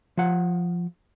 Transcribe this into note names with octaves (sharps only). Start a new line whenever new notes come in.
F3 F#5